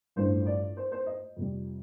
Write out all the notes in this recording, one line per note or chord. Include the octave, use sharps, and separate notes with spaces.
A1 G2 F3 A3 C5
D5
C5
C5
D#5
F2 C3 G3